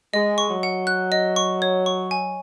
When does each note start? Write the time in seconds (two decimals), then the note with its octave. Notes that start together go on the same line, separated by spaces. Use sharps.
0.13 G#3 D#5
0.38 C#6
0.50 F#3
0.63 F#5
0.87 F#6
1.12 D#5
1.36 C#6
1.62 C#5
1.86 C#6
2.11 G#5